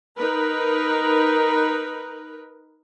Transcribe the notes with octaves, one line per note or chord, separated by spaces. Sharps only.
D#4 A#4 B4